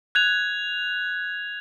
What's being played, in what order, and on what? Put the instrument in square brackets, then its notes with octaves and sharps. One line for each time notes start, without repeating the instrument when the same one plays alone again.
[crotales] F#6 G#6 F7